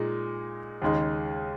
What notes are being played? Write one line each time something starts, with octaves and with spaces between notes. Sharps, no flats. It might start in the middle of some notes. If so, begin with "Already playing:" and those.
Already playing: A#2 G#3 D#4
D#2 C#3 G#3 D#4